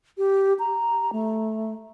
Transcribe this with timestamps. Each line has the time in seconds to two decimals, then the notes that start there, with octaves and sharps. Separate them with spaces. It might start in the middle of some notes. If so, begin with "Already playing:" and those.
0.18 G4
0.59 A#5
1.13 A3